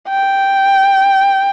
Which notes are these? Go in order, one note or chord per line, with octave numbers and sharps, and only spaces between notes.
G5